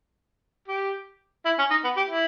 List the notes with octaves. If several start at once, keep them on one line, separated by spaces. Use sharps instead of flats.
G4
E4
C#4
D#4
B3
G4
E4